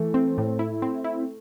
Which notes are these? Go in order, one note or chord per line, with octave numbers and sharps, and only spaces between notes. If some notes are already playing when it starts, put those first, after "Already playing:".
Already playing: E3 A3
C4
A2
E4
C4
E4